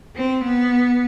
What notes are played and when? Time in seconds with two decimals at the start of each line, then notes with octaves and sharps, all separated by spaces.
0.16 C4
0.44 B3